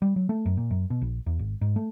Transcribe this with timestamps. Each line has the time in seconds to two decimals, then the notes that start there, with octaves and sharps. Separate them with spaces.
0.02 G3
0.16 F#3
0.29 A3
0.46 F#2
0.57 A#2
0.71 F#2
0.90 B2
1.02 A#1
1.26 E2
1.39 G#1
1.61 G#2
1.76 A3